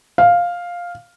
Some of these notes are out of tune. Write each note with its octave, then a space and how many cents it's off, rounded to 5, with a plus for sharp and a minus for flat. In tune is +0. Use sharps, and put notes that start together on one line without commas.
F5 +5